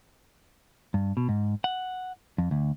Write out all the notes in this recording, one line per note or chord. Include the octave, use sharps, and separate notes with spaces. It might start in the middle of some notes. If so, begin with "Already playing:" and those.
G2
B2
G#2
F#5
F2
D2